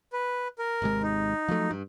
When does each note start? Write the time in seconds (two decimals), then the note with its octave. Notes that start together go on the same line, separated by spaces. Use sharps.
0.13 B4
0.59 A#4
0.82 G#1 C3 G#3
1.03 D#4
1.48 F3 F#3 A3
1.71 G2